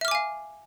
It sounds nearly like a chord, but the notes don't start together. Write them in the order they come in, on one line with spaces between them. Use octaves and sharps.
E5 F6 D6 G#5 F5